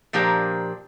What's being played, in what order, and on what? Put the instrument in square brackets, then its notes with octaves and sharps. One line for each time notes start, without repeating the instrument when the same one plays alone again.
[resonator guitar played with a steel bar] A#2 F3 D4 G4 A#4 C5